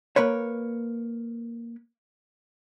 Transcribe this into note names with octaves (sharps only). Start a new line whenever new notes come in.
A#3 A#4 B4 C#5